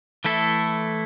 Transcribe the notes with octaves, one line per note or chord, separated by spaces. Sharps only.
E3 A3 E4 A4